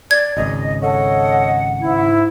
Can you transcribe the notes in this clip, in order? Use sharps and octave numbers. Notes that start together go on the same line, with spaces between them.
D5 G#6
G#1 C#2 D#5
A4 C#5 D#5 F#5
G#2 E4